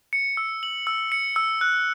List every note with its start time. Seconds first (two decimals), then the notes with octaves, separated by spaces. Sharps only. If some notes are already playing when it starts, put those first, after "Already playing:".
0.13 C#7
0.37 E6
0.63 F#7
0.87 E6
1.12 C#7
1.36 E6
1.61 F#6